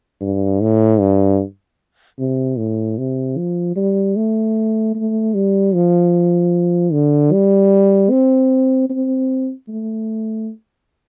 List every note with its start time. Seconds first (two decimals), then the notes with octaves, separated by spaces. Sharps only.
0.21 G2
0.61 A2
1.00 G2
2.19 C3
2.58 A2
2.98 C3
3.38 F3
3.76 G3
4.17 A3
4.95 A3
5.34 G3
5.74 F3
6.92 D3
7.32 G3
8.10 C4
8.90 C4
9.68 A3